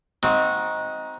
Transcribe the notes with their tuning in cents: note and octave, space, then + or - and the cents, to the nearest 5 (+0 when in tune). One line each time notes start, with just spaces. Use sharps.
C4 +0 D#4 +15 F#4 -20